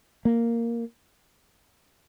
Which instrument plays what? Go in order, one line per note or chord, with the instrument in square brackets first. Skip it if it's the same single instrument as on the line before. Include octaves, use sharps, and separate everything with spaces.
[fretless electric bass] A#3